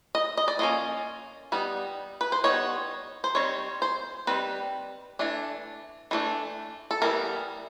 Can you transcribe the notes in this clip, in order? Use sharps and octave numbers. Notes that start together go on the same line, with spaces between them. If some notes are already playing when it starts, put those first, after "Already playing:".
D#5
D#5
D5
F3 A#3 C#4 D#5
G3 B3 D#4
B4
C5
G3 B3 D#4 C#5
C5
D#3 G3 C4 C#5
C5
D#3 G3 C4 B4
E3 A3 D4
E3 A3 D4
A4
E3 G3 B3 A#4